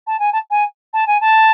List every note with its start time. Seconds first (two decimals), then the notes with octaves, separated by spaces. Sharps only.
0.07 A5
0.19 G#5
0.32 A5
0.50 G#5
0.93 A5
1.07 G#5
1.21 A5